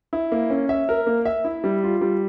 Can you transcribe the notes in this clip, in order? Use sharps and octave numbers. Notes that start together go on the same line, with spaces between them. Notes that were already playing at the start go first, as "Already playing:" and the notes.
E4
A#3
C#4
E5
A#4
A#3
E5
E4
G3
F4
G3